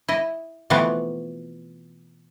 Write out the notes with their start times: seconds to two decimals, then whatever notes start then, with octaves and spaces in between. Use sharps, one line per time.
0.08 E4 D#5
0.70 B2 E3 F3 A3 B3 C4